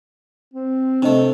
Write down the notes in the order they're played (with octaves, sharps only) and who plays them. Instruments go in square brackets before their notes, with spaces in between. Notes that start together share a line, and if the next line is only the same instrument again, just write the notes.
[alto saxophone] C4
[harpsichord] C3 A3 [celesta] D4 D#5